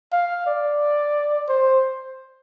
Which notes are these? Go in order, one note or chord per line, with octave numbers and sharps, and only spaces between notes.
F5
D5
C5